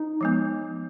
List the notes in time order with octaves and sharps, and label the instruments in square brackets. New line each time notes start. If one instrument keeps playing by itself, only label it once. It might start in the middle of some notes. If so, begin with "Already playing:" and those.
Already playing: [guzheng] D#4
[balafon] F3 G#3 B3